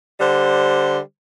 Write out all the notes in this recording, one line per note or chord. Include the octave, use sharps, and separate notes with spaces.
D3 G3 C5